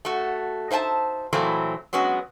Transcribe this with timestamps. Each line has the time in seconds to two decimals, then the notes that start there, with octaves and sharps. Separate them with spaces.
0.05 A3 F#4
0.71 D#4 C5 E5 G#5 A5
1.33 A#2 E3 F#3 A3 C4 E4
1.93 F#3 G#3 B3 C#4 F#4